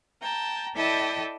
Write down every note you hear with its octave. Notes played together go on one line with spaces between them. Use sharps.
G5 A5 A#5
E4 A4 D5 D#5 G5 A5